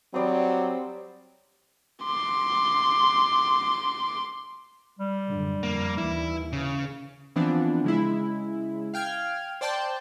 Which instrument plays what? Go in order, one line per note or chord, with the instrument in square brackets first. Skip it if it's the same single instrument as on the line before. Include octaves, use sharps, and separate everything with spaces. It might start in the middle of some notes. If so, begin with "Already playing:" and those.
[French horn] F#3 [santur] G3 D5 D#6 [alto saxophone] C4
[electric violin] C6 D6
[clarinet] G3
[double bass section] F#2 D3
[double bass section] F2 [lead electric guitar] A#3
[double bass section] D#2 E3 [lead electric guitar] E4
[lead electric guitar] C#3
[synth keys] E3 F3 B3 C4 D4
C#3 G#3 E4
F5 G5 F6 G#6
C5 D5 G5 A5 C6 G6